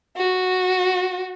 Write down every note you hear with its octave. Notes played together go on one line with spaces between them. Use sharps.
F#4